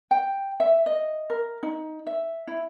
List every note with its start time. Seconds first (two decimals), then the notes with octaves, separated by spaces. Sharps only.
0.11 G5
0.60 E5
0.86 D#5
1.30 A#4
1.63 D#4
2.07 E5
2.47 E4